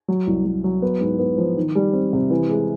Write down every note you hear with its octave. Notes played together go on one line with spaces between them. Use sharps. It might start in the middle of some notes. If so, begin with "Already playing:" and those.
F#3
C2
F#3
F#3
B3
G#2
B3
F3
D#3
G3
C4
C3
E3
G#3